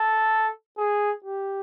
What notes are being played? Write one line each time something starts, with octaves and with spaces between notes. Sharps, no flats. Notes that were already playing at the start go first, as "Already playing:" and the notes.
Already playing: A4
G#4
G4